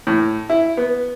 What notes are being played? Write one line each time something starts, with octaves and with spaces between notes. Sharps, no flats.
A2
E4
B3